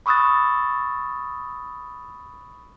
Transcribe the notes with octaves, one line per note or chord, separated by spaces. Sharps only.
B5 C#6 D#6 E6 F#6 A6